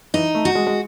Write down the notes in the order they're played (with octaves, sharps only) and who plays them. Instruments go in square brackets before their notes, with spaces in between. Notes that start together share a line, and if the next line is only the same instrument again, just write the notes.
[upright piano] E3 [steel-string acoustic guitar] D#4
[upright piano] A3
[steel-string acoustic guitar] F#4
[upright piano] G#3
G#3